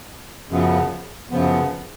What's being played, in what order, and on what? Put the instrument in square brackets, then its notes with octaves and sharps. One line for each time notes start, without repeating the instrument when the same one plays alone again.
[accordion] F#2 C#3 F3 B3
F#2 C#3 F3 B3